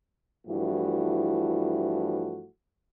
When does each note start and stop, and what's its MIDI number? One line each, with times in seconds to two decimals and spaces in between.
0.46 2.45 43
0.46 2.45 52
0.46 2.45 53
0.46 2.45 57
0.46 2.45 64
0.46 2.45 66